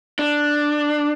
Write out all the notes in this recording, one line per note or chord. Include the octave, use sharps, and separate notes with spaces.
D4